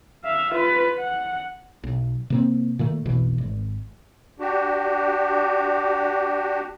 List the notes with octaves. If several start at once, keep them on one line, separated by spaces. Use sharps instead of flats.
E5 F5
F4 B4
F#5
B1
C3 A#3 C4
A#2 D#3 A3
F1 B1 B2 E3
G#1
D4 F#4 G4